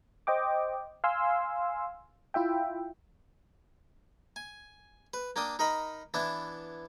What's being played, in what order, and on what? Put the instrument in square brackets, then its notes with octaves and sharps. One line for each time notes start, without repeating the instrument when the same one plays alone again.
[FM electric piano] C5 D#5 G5 D6
F5 G#5 C6 E6
E4 F4 E5 G5
[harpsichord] G#5
B4
A#3 D4 G5 D#6
D#4 A#4 D#5 B5
E3 B3 D4 E4